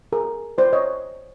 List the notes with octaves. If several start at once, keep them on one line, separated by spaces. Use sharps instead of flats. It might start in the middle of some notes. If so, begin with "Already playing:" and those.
G#4 A#4
C5 D5
C#5 D#5